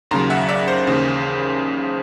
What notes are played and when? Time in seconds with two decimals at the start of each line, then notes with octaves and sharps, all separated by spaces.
0.11 D#2 C#3 F#3 A#5 C6
0.30 E5 F#5
0.49 D5 E5
0.68 C5
0.87 D#2 C#3 E3 C5